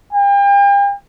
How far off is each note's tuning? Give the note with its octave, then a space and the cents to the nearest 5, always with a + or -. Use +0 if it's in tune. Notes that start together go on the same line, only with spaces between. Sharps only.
G5 +40